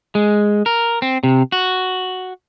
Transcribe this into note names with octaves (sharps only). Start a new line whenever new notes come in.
G#3
A#4
C4
C3
F#4